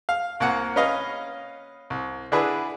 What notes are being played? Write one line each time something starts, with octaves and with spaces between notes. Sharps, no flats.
F5
C2 A#3 F#5
C#4 B4 D#5 F5
C2
D3 D4 E4 G#4 B4